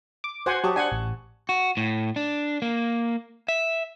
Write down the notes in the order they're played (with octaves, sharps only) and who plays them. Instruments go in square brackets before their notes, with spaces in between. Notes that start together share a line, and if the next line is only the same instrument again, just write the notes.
[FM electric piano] D6
[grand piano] F#4 [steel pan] C5 F#5 G#5
[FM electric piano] F#3 [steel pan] G4 [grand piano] A5 C#6 D#6
[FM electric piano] D4 C5 [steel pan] F#5 G#5
[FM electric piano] A1
[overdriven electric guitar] F#4
A2
D4
A#3
E5